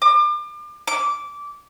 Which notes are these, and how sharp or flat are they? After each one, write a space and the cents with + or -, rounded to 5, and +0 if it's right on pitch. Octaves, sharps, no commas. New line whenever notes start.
D6 +35
D6 -15